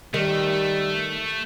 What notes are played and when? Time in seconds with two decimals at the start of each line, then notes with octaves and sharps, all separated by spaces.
0.14 D#3 G3 A3